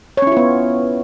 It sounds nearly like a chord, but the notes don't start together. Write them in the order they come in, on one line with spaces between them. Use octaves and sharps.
C#5 C#4 E4 F4 B3